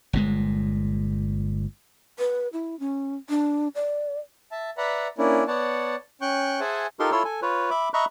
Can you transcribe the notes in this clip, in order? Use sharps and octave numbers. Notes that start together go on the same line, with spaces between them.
G1 A#2 G#3
B4
E4
C#4
D4
D5
E5 A5
B4 D5 E5 F#5 A#5 B5
A#3 C#4 D4 E4
B3 C#5 D5 F#5 A5
C#4 G5 C#6 F#6 G6
G#4 C5 E5 F#5 G#5 A5
D#4 F4 G4 A4 A#4 C6
E4 F4 A4 C#5 C6 E6
A4 G#5
F4 B4 C#5
E5 B5 D6
D#5 E5 A#5 B5 C#6 F#6